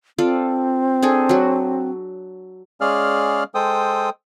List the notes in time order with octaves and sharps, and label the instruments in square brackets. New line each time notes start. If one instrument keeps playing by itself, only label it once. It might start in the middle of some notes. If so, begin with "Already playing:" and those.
[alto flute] C4 [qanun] F4 A4 D5
[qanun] D4 G#4 A4
F#3 F#4
[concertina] G#3 C#4 G#4 D5 F5 F6
G#3 A4 C5 G5 D#6